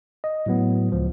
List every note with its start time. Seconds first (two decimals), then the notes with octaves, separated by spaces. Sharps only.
0.24 D#5
0.46 A2 F#3 B3
0.92 C#2 F3